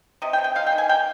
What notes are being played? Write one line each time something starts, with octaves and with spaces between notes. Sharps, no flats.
C3 D#5
G5
C3
G5
G#3 F5
G5
D#3
G#5
A#3 G5